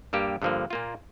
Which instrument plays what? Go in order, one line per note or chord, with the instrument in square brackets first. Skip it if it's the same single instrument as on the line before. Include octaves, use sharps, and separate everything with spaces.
[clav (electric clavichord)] G2 G3 A#3 G4
G2 D3 F3 A#3
A#2 A#3 F4